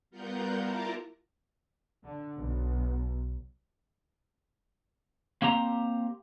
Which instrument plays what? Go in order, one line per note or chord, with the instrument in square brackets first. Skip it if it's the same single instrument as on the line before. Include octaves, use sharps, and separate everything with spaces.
[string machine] G3 B3 F4 A#4 F#5 G6
E4 F4 A#4 A5 A#5 D6
[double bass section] D3
B1
[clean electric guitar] A#3 C4 G4 A#5